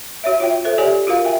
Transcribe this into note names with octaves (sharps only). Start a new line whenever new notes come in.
F#4 C#5 E5
F4 C#5 E5 G5
A4 C5 E5
G4 C#5 D5 E5 G#5
F4 F#4 A#4 F5
E5 G5 G#5